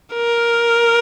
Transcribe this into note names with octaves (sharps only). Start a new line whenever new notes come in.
A#4